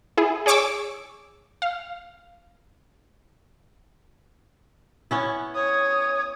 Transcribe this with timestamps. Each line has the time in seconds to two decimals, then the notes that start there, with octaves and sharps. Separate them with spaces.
0.17 E4 G#4
0.46 G#4 C#5 C#6 D6 E6
1.62 F5
5.11 B3 C#4 E4
5.55 C#5 D#6